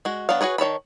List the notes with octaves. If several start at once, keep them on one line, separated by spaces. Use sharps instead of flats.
G#3 F#4
F#3 B3 D4 C#5 F5
F#4 G#4 B4 C#5
D#3 C#5 A5 B5